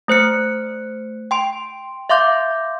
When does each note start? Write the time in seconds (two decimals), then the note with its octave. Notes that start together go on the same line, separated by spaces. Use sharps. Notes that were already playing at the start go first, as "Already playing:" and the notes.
0.08 A3 C5 F#6 C#7
1.31 G5 C6 D7
2.10 E5 F5 C6 D6 G6